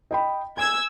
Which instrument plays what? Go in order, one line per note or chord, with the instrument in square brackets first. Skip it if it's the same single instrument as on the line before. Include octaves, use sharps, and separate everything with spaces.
[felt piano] D#5 G5 B5
[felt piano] G#5 [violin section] E6 G#6